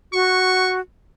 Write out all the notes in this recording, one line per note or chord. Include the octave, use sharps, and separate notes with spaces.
F#4 C#6